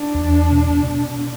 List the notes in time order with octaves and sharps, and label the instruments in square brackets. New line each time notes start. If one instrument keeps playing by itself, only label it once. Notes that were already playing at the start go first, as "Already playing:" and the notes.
Already playing: [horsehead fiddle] D4
[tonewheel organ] E2
B2
B2